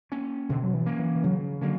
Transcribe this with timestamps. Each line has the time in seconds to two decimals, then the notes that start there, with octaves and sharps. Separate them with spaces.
0.12 A#3 C#4
0.49 B2 D3
0.63 F#3
0.74 E3
0.86 A#3 C#4
0.99 E3
1.16 E3
1.23 C#3 F#3
1.61 D3 F#3 A#3 C#4